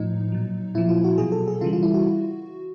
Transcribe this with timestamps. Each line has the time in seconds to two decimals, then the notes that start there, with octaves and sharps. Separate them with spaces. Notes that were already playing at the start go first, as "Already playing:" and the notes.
Already playing: A2 F3 D#4
0.32 A#2 F#3
0.75 A#2 F3 E4
0.89 F4
1.04 F#4
1.18 B2 F#3 G#4
1.32 A4
1.48 G#4
1.61 C#3 F4
1.64 E3 G3
1.73 F4
1.83 E4
1.94 F#4